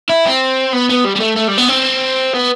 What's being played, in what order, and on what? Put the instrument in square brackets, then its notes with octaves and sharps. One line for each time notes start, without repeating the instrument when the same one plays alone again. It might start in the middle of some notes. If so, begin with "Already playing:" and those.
[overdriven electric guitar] E4
C4
B3
B3
G3
G3
A3
A3
G3
B3
C4
B3